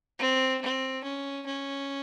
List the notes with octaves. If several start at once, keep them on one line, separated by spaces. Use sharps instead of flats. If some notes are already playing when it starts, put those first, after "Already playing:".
C4
C4
C#4
C#4